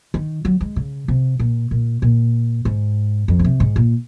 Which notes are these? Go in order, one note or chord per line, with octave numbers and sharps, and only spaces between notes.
D#3
F#3
G#3
C#3
C3
A#2
A#2
A#2
G#2
F2
C#3
C3
G#2
A#2